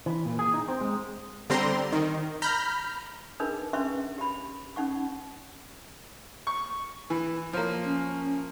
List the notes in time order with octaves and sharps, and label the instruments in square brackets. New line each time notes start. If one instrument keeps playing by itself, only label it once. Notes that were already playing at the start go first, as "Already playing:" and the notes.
[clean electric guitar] E3
A#2
G#4
D#4
C4
G#3
[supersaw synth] D3 G3 C4 A#5 C6
D#3
A#5 B5 F6 G6
[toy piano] D4 D#4 G#4 A#4 B4
C#4 D4 B4 E5 C6 C#6
G4 B5
C#4 D#4 F#5 C#6
[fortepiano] C#6
E3
[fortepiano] F3 A#3 [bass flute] C#5
[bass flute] C#4